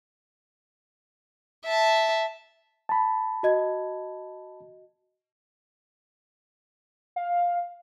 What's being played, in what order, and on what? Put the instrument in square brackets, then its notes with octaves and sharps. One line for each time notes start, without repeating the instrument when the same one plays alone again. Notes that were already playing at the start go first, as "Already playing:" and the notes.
[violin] E5 A5
[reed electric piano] A5 B5
[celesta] F#4 D#5 G#6
[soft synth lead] F5